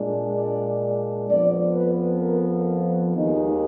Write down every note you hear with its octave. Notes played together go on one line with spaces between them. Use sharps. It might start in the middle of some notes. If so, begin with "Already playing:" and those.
Already playing: A#2 G#3 D4
D5
F2 F3 B3 D5
B4
A#4
D#2 D#3 G#3 D#4